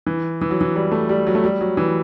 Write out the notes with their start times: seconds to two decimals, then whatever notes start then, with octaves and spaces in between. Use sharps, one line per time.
0.06 E3
0.41 E3
0.51 F#3
0.61 E3
0.76 G3
0.92 A3
1.09 G3
1.27 F#3
1.35 A3
1.44 G3
1.61 F#3
1.77 E3